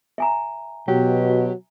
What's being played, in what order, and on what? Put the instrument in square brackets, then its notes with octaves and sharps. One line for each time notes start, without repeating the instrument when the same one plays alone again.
[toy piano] E5 G#5 A#5
[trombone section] B2 [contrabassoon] F#3 [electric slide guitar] G4